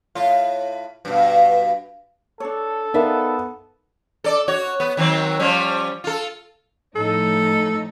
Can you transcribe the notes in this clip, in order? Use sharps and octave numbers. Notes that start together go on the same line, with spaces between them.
A2 F4
G2 B2
D4 A4 C#5
B3 D#4 A#4 D5 E5 F5
A4 D5
F#4 C#5
B3
D#3 F#3 C4
F3 G3 C#4
F4 A4
A2 F3 D#4 A4